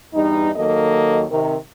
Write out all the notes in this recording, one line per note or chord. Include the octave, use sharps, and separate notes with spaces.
E2 G2 G3 D#4
D#2 D#3 F#3 A#3 A4 D#5
C3 D#3 A#4